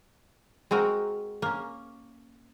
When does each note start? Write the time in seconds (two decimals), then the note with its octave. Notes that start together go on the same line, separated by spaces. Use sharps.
0.71 G#3 C4 F#4 A#4
1.42 A#3 C#4